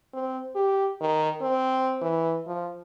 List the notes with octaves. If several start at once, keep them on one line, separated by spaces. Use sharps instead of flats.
C4
G4
D#3
C4
E3
F3